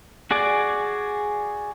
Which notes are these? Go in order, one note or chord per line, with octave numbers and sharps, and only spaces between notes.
F#4 G#4 D5 D6